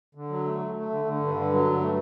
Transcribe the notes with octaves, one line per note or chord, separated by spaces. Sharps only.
D3
F#3
A3
A3
A3
D3
D3
G2
D3
F#3
G2
A3